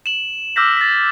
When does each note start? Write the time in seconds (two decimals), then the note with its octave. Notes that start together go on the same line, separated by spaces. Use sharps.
0.06 E7 F#7
0.56 D6 E6 F6 G6 A#6 B6
0.77 A6 B6